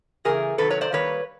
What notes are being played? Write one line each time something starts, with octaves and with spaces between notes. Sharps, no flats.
C#3 E3 A3 G#4 A#4
C3 D#3 F#3 A4 B4
B4 C#5
C5 D5
D#3 G3 A#3 B4 C#5